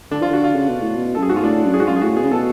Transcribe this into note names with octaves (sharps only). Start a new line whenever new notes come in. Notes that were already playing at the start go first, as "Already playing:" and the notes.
D3 D4
F3 F4
D3 F#4
F4
C#3
B2
A2
B2
F#2 A4
G#4
G#2 F#4
F4
A2 D4
F#2
G#4
G#2 F#4
F#2 F4
G#4
A2 F#4
B2 G#4
C#3
B2 A4